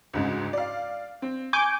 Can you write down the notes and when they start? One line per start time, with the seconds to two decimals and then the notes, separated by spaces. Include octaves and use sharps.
0.13 D2 G#2 C#3
0.53 D5 F5
1.22 C4
1.53 G#5 C#6 D6 G6